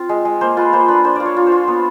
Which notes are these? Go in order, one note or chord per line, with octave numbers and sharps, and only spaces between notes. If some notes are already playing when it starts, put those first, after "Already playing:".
Already playing: C4 F4
G#3
G#3
A#3 C5
F4 B4
A#3 C5
D4 B4
D4 C5
F4 D5
C#5
F4
C5
F4
B3